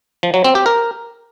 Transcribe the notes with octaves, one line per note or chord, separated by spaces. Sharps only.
F3
F#3
C4
G4
A#4